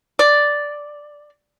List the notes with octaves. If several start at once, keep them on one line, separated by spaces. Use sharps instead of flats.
D5